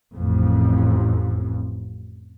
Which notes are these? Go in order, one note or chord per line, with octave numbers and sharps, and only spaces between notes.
A1 F2